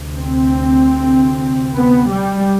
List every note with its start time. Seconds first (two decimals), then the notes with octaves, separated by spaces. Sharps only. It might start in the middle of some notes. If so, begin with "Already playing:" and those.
Already playing: D2 C3
0.16 C4
1.76 B3
2.09 G3